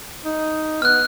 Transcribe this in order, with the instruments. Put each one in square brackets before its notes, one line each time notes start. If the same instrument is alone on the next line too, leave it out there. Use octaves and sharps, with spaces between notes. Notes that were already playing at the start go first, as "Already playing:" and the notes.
[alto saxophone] D#4
[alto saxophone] B3 [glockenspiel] F6 F#6